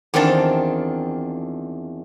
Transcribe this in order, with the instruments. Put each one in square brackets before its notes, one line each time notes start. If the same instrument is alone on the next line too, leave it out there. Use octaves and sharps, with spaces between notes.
[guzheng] E2 D#3 F3 C4 D4 A5